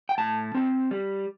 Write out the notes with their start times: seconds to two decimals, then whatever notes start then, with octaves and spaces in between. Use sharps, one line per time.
0.09 G5
0.18 A2 A5
0.55 C4
0.91 G3